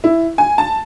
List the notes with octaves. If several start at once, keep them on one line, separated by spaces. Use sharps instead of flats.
E4
G#5
A5